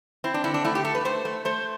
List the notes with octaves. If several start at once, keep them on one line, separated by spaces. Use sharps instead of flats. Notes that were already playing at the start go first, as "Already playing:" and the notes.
C4 E4
D4
D3 E4
D4
A3 E4
G4
A3 A4
B4
A3 C5
A3
A3 C5